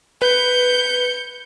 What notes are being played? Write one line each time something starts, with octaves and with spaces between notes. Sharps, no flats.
B4 G6 C#7